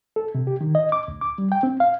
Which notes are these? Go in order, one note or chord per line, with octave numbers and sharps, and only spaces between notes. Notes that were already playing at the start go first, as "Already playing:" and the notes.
A4
C3
G4
D#3
D#5
D6
D2
D6
G3
G5
C4
F5